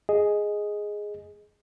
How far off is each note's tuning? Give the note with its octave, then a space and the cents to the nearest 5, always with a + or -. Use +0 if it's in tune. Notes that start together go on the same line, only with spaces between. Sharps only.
G#4 +0 D#5 +0